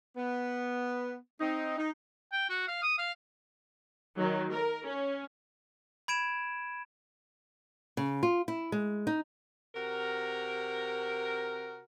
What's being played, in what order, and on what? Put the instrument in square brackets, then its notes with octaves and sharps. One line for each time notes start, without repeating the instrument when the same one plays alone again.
[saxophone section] B3
C4 D#4
D#4
[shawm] G5
F#4
F5
D#6
F5
[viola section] D#3 F#3
A#4
C#4
[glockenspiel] B5 G#6 D7 E7
[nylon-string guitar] C#3
F4
E4
G#3
D#4
[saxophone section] C3 F#4 A#4